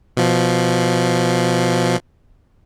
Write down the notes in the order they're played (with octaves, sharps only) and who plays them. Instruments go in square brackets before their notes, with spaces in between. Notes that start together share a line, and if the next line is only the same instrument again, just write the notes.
[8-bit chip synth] B2 F3